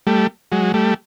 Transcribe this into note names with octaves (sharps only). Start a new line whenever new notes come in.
G3 A3
F#3 G#3
G3 A3